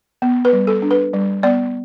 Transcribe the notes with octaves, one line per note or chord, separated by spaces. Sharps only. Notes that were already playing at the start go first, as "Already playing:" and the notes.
B3
B4
G3
A4
D4
B4
G3
B3 D5